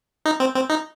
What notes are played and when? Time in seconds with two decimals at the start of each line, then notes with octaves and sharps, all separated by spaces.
0.26 D#4
0.40 C4
0.55 C4
0.70 D#4